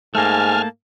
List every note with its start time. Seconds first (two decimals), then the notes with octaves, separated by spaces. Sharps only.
0.15 G#2 A3 A#3 G#5 A5 F6